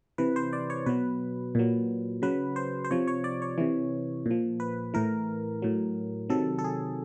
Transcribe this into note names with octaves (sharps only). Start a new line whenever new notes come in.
C3 E3 B4
C5
D5
C#5
B2 F#3 B4
A#2 F#3
C#3 F#3 B4
C5
C5
C3 F3 C#5
C#5
D5
C#5
C3 E3
A#2 F3
B4
A2 E3 A#4
A2 F#3
C3 D#3 F#3 A4
A4
G#4